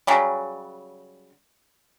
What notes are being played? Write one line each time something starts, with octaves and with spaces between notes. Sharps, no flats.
C#3 F#3 G3